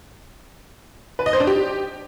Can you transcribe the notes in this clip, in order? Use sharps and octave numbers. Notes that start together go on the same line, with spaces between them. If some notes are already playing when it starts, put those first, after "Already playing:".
B4
D#5
C5
D4
G4